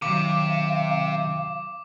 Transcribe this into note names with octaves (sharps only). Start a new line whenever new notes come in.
C3 D#3 F#3 F5 D6